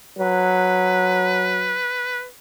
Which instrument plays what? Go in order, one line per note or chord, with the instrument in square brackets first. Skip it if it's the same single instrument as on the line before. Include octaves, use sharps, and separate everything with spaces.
[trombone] F#3 [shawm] B4